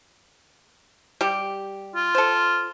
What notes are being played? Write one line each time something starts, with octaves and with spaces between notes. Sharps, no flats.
G3 G4
F4
A4 C5